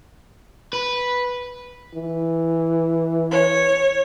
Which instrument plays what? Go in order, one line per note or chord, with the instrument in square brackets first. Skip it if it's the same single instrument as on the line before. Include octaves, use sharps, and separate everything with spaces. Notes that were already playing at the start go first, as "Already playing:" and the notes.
[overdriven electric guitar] B4
[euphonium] E3
[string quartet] C#5